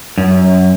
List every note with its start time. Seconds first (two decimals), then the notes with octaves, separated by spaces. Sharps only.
0.18 F#2